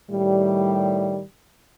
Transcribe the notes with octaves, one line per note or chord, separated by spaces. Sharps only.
A2 D#3 G3